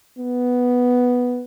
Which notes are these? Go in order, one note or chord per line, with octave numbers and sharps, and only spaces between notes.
B3